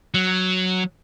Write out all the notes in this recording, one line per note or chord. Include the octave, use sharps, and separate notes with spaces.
F#3